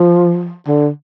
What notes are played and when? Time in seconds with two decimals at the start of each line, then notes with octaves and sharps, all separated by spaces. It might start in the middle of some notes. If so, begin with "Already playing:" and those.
Already playing: F3
0.68 D3